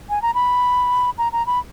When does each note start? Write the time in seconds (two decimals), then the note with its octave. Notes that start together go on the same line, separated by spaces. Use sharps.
0.10 G#5
0.22 A#5
0.34 B5
1.18 A#5
1.32 A#5
1.47 B5